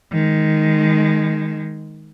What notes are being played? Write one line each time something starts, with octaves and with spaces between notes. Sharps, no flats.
D#3 G#3